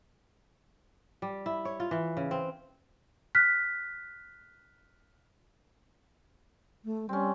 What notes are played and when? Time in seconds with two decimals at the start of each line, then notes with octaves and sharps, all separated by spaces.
1.22 G3
1.46 E4
1.65 C#5
1.80 F4
1.91 E3
2.17 C#3
2.31 C4
3.35 F6 F#6 B6
6.85 A3
7.09 G3 C4 C#4